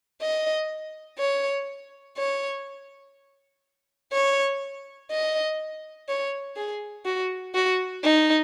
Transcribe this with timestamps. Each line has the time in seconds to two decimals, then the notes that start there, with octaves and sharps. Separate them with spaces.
0.22 D#5
1.19 C#5
2.17 C#5
4.12 C#5
5.11 D#5
6.08 C#5
6.56 G#4
7.05 F#4
7.55 F#4
8.03 D#4